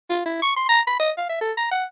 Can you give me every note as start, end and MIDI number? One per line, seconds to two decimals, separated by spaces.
0.10 0.21 65
0.25 0.38 64
0.42 0.51 85
0.56 0.65 84
0.69 0.80 82
0.87 0.99 83
0.99 1.11 75
1.17 1.27 77
1.29 1.39 76
1.41 1.52 69
1.57 1.67 82
1.71 1.84 78